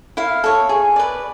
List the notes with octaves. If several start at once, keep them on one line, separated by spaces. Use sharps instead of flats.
E4 F5
A4 C#5
G#4
B4 D5